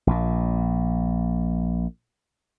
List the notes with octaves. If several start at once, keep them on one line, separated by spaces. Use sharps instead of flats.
A#1 A#2